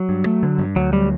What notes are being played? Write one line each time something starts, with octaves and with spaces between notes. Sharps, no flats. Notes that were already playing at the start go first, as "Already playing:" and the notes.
Already playing: F#3
G2
A3
D3
G2
D2 F#3
F#3 G3